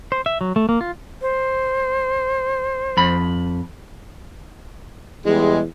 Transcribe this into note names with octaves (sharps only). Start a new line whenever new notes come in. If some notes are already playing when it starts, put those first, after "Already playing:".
C5
E5
F#3
A3
A#3
F4
C5
F2 B5
E2 G3 G#3